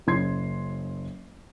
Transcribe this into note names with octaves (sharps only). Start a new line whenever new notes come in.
F#1 C#4 C6 G#6 C7